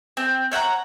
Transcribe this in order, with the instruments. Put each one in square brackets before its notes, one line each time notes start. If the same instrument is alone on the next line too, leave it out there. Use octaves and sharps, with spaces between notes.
[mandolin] C4
C#5 E5 F#5 A#5